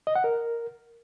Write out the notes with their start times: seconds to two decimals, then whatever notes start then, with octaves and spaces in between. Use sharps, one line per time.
0.07 D#5
0.16 F#5
0.24 A#4